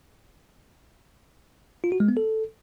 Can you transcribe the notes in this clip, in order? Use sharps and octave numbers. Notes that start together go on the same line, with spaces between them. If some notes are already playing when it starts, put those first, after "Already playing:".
F4
F#4
G#3
B3
A4